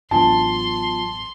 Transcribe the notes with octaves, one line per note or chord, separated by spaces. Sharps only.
A1 F#3 B3 D4 F4 A5 C6